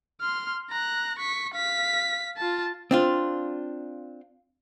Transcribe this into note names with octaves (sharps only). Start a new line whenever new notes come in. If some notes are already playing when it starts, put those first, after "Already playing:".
C6 F6
A#5 F#6
C#6 B6
F5 B6
F4 A5
C4 D4 F4